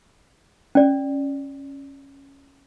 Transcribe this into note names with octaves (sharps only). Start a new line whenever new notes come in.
C#4 D5